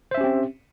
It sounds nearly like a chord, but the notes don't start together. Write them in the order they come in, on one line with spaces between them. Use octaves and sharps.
C5 E5 C#4 G4 C4